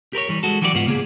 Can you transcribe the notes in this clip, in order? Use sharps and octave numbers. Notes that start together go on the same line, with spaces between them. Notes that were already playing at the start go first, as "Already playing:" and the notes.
G4 A#4 B4 C#5
E3 G3
G#3 F#4 A4
E3 F#3 F#4 G4 A#4 D5
C#2 G#2 B3 F4 F#5
C#3 A#3 B3 G#4